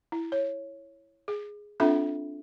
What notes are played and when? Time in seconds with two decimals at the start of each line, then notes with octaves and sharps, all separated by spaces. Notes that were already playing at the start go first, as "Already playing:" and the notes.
0.12 E4
0.32 C#5
1.28 G#4
1.80 C4 D4 F4 A4 E5 B5